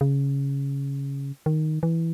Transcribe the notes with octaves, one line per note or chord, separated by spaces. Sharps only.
C#3
D#3
E3